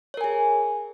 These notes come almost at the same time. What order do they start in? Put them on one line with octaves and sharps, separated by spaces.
C#5 A#4 G#5 G#4